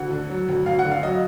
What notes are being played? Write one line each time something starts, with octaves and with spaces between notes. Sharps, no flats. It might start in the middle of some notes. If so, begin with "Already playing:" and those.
Already playing: D2 F#5
D3
F#3
D2
D2 F5
F#5
D3
F5
F#3 D#5